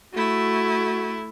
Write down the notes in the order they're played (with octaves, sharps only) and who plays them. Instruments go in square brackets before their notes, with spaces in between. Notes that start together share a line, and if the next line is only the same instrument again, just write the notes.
[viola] A3 E4 [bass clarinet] F#4